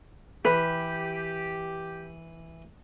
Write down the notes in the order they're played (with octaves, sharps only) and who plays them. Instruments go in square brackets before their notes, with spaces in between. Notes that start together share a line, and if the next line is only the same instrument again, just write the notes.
[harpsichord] E3 [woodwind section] G4 [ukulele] B4